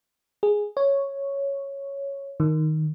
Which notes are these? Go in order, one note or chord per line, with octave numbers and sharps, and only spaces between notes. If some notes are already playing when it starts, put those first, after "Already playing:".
G#4
C#5
D#3